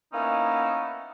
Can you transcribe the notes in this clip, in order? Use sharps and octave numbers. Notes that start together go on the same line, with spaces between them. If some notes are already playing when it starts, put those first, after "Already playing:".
A#3 B3 C#4 D#4 E4